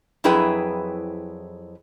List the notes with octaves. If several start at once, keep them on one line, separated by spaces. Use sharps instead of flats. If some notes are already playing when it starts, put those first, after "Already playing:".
F2 F#3 E4 G#4 B4 G5